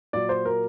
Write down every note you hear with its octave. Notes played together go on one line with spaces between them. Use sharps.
A#2 F#3 D5
C5
A#4